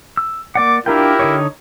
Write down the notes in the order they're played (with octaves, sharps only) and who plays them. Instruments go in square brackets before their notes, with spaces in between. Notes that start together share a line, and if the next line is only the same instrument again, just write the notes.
[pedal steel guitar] E6
[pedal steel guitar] A#3 D5 F#5 [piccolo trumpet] D6
[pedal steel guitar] D4 F4 G5 [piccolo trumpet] E4 [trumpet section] G4 A#4
[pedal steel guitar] D3 D#4 C#5